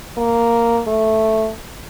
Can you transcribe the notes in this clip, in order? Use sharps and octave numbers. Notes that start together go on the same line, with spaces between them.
A#3
A3